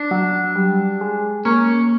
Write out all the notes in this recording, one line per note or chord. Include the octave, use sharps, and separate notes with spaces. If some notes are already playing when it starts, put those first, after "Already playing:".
Already playing: D4
F#3
G3
G#3
A#3 C#4